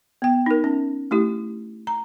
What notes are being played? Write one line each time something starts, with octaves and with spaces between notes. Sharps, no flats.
B3 G5
D#4 A#4
C#4
A3 E4 G4
A#5